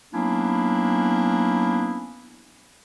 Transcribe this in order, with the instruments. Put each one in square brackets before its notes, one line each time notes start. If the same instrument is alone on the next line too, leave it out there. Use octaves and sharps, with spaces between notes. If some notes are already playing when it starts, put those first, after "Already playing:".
[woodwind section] F#3 A#3 B3 C#4 D4 E4